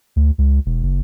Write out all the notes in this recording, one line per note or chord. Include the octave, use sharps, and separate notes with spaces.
D2
C#2
E1
F#1